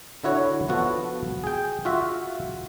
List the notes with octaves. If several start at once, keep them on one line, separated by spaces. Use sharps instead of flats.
D3 E4 F#4 C#5
F3 B3 F#4 A4
G#4 G5
F4 F#4 E5